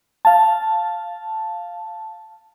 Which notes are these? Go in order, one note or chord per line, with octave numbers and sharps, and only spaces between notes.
F5 A5